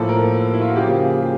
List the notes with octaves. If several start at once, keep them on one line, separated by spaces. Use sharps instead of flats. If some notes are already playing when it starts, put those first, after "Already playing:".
Already playing: A2 F3 A#3 A4
A#4
E4
F4
F#4
C#3 F3 A#3 G4
G#4
G4